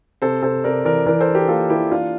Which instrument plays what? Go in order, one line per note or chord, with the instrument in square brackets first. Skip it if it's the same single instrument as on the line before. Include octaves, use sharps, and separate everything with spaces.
[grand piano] C3 A4 C5
C3 A4 C5
C3 A#4 D5
E3 A#4 D5
E3 A#4 D5
A4 C5
D4
G4 A#4
A#3 F4 A4
E3 E4 G4
D4 F4